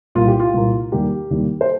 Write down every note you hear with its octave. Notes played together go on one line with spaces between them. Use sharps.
C2 A#2 A#3 F4
G4
F4
C2 A#2 A#3
D#2 D#3 G3 A#3 G4
D#2 D#3 G3 A#3
C5